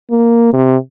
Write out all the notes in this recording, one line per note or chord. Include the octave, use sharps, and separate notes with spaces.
A#3
C3